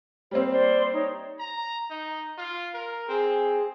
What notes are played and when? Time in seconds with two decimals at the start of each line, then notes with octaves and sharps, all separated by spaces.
0.31 G3 A#3 C4 C5 C#5
0.51 C5 D5 C6
0.93 D#4 C#5
1.39 A#5
1.90 D#4
2.38 F4
2.74 A#4
3.09 C4 G#4